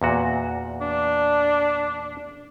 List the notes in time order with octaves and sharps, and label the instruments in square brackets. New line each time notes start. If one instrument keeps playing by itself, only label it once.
[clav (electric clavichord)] E2 A#2 F#4
[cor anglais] D4